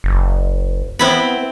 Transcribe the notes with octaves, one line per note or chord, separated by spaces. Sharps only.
F#1
B3 C4 E4 B5